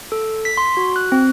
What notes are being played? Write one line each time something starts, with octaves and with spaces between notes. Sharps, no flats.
A4
B6
C6
F#4
F#6
C4